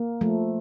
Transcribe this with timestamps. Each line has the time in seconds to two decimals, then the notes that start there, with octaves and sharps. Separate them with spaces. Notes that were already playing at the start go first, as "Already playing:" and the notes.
Already playing: A#3
0.21 F3 A3